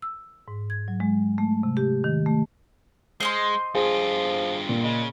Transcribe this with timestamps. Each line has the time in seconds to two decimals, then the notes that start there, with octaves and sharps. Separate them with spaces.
0.02 E6
0.48 G#2
0.70 G#6
0.88 F#3
1.00 G#3
1.38 A3
1.63 C3
1.77 G4
2.04 D#3
2.26 A3
3.20 G#3 C5 D#5 C6
3.75 G2 F3 F4 G#4
4.69 A#2
4.84 C#3 G#3